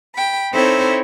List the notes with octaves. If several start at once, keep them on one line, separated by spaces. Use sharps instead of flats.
G5 B5
C4 D#4 E4 A4 C5 C#5